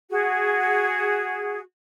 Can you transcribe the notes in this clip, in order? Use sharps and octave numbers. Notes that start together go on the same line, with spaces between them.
F#4 G#4